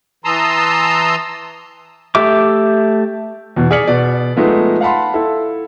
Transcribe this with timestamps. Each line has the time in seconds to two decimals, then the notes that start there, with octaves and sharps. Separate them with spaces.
0.24 E3 A5 A#5 C6 D#6 E6
2.15 A3 G4 E5 D6
3.56 E2 B2
3.71 G#4 D5 F6 B6 C#7 F#7
3.87 B2 D5
4.37 F3 G#3 A3 B3 D#4
4.81 F5 F#5 A5 B5 C6
5.14 E4 A4